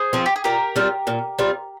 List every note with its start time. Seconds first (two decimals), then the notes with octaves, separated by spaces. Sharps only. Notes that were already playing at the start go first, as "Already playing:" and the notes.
Already playing: G#4 C5
0.13 F3 C4
0.26 G4
0.36 G#4
0.44 A#2 G4 A#4
0.76 G3 C4 F4
1.07 A#2
1.39 G3 C4 F4